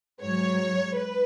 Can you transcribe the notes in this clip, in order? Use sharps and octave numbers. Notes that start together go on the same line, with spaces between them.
G#2 F#3 C#5
B4